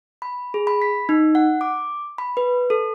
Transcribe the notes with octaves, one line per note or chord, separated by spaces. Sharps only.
B5
G#4
B5
B6
D#4
F#5
D6
B5
B4
A4